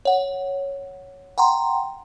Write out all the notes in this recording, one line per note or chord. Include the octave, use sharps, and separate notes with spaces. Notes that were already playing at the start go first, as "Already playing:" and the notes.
C#5 F#5
F#5 G5 A#5 C6